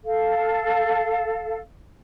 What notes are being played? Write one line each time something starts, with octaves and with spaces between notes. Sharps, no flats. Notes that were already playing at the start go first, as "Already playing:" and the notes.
A4 F5